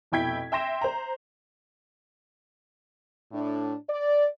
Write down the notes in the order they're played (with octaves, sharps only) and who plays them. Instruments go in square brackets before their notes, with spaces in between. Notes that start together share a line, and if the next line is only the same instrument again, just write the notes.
[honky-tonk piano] F1 B2 E4 G5 G#6 B6
E5 G5 C6 A#6 E7
C5 A#5
[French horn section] A2 D4
D5